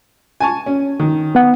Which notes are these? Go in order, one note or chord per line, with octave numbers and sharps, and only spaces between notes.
G#5 A5 C#6
C#4
D#3
B3 F#5